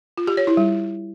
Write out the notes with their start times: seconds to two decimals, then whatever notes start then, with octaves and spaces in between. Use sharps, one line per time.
0.18 F4
0.27 G4
0.37 C#5
0.47 E4
0.57 G3